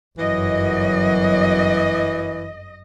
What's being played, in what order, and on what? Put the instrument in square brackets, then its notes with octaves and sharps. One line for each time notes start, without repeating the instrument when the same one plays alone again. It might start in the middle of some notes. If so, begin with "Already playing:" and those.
[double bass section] G1 F#2 F#3 [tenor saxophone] E3 [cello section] D#5